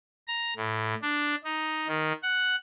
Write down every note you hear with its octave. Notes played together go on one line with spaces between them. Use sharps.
A#5
A2
D4
D#4
D#3
F#5